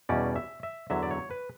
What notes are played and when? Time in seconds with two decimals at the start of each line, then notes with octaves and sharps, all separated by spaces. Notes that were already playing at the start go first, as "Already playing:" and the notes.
0.09 E2 B2 G3 C#4 D5
0.36 E5
0.63 E5
0.90 E2 D3 F#3 E5
1.03 D5
1.11 C#5
1.31 B4